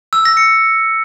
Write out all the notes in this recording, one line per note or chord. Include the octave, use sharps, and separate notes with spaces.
E6
A#6
C#7